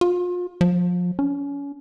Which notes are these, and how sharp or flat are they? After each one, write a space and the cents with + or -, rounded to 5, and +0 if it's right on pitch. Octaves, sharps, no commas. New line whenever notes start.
F4 +35
F3 +30
C#4 +30